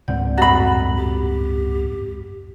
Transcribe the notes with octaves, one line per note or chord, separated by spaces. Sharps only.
C#2 G#2 C4 D5 F#5 G6
F#2 A2 G3 F#4 B5
G4